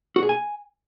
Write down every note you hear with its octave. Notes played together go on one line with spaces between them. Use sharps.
F#4
G#4
G#5